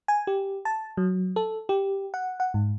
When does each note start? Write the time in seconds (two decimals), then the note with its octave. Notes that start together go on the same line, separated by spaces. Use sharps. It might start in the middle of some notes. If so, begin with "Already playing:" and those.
0.08 G#5
0.27 G4
0.65 A5
0.97 F#3
1.36 A4
1.69 G4
2.14 F#5
2.40 F#5
2.54 G#2